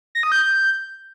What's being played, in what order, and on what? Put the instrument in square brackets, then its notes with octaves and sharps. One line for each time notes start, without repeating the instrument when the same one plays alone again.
[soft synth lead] A#6
D#6
G6